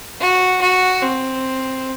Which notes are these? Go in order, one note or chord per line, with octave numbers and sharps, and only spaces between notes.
F#4
F#4
C4